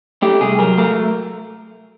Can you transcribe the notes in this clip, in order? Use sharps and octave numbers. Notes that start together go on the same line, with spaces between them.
A3 G4
C2 G#4
F#3 A#4
A3 A#4